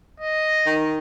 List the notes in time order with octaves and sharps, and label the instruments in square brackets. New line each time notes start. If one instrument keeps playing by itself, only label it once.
[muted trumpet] D#5
[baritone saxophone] D#3